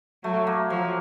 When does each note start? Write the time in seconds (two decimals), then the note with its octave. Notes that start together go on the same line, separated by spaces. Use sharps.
0.23 F#3 A3
0.47 A#3
0.70 F3 F#3